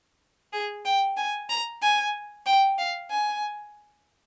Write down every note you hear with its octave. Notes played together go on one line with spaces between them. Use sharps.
G#4
G5
G#5
A#5
G#5
G5
F5
G#5